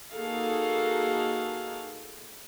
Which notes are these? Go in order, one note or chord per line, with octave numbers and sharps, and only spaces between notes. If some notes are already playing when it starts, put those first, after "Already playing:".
A#3 D#4 F#4 G#4 A4 F5